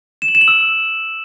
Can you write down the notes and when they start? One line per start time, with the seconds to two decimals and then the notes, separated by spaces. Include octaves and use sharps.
0.22 E7
0.28 F#7
0.35 E7
0.41 F#7
0.48 E6